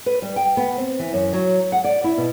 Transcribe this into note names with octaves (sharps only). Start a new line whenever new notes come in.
B4
G3
G5
B3
C4
E3
F#2
F#3
F#5
D5
E4
B2